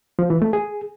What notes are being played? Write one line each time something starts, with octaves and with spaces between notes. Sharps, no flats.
F3
E3
A3
G#4